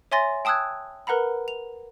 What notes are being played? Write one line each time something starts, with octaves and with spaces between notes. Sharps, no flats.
C#5 E5 G#5 C6 A6 A#6
G5 A5 D#6 E6 F#6 G#6
A#4 B4 F#5 A#5 B5
F7